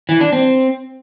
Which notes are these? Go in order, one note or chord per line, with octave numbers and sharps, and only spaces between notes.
E3
D4
C4